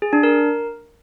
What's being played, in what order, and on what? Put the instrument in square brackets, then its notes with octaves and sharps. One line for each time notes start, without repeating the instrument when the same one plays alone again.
[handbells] G#4
D4
A#4